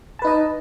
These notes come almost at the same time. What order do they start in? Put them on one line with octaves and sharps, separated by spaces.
A5 B4 D#4 D#5